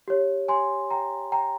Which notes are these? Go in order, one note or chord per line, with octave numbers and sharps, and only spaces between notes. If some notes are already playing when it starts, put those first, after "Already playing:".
G4 C#5
G#5 C6
G5 A#5
G5 A#5